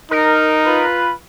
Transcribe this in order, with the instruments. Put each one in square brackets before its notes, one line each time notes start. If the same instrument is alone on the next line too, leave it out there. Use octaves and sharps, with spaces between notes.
[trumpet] D#4 [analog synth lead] A#4
[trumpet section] F4 B4